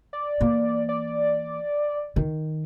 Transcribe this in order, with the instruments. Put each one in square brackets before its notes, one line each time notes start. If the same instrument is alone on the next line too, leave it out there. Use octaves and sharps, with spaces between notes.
[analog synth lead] D5
[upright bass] E3 A#3
[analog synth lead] D5
[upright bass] D#3